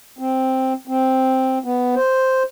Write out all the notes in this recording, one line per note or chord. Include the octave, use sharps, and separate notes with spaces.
C4
C4
B3
C5